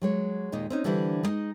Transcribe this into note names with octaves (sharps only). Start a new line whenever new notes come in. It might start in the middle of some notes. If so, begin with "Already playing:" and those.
F#3 G#3 C#5
D#2 A#2 G#3 D#4
C4 C#4 D#4
D3 E3 G3 D4 E4 C5
G#3 D#4